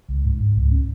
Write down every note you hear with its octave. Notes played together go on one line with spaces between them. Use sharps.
C#2
G#2
G#2
C#2
C#4